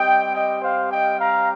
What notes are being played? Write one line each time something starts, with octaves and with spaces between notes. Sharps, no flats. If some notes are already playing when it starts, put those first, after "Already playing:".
Already playing: G3 C4 G4 D#5 G5
D#5 G5
C5 F5
D#5 G5
F5 A#5